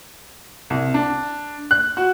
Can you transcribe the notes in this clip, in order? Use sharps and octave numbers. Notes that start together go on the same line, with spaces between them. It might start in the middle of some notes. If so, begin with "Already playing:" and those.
C2
D4
F#6
F#4